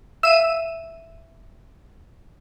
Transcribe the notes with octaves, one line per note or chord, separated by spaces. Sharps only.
E5 F5 E6 D#7